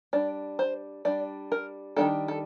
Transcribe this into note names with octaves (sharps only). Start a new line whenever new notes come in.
G3 D4 D5
C5
G3 D4 D5
A#4
D#3 G3 A#3 D4 A4
A4